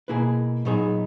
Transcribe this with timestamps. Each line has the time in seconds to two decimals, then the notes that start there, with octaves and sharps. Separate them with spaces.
0.08 B2 A#3 E4 G#4 B4
0.65 A#2 F#3 B3 D#4 G#4